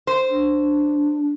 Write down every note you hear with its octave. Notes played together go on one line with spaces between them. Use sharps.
C5
D4